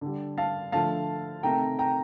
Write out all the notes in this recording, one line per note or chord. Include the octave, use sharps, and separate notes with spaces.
D3 G3
F5 A5
D3 F3 A3 F5 A5
C3 D#3 A3 G5 A#5
G5 A#5